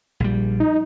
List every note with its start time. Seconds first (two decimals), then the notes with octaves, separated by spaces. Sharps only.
0.20 A#1 G3
0.60 D#4